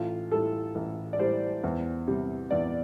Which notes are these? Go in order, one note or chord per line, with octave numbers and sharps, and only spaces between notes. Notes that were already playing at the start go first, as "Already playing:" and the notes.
Already playing: A1 F4
A2 G3 A4
A1
D5
A2 G3 C5
E2
C3 G3
E2 D5